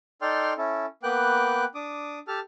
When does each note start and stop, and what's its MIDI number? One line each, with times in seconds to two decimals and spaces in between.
0.22 0.53 63
0.22 0.53 69
0.22 0.53 74
0.22 0.53 79
0.22 0.53 84
0.22 0.53 89
0.58 0.86 61
0.58 0.86 64
0.58 0.86 69
1.03 1.65 58
1.03 1.65 59
1.03 1.65 71
1.03 1.65 79
1.03 1.65 86
1.03 1.65 90
1.75 2.19 62
1.75 2.19 86
1.75 2.19 87
2.28 2.40 67
2.28 2.40 69
2.28 2.40 81
2.28 2.40 89